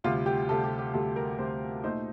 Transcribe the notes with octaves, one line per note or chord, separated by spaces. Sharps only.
D2 C3 G3 F4
G4
D2 C3 G3 A4
G4
G4
D2 C3 G3 A4
A#4
D2 C3 G3 C5
A#2 A3 D#4 C5